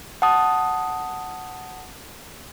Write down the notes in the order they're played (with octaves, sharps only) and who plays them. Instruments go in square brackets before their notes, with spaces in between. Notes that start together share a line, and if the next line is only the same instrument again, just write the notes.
[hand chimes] F#5 A5 D#6